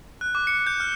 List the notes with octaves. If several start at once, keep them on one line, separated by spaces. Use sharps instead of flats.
F#6
D6
C#7
G6
F6